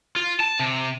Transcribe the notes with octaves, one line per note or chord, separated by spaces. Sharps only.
F4
A5
C3